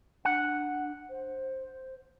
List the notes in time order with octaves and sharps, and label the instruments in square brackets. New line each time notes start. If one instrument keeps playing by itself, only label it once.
[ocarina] D4 [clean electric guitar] F#5
[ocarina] C5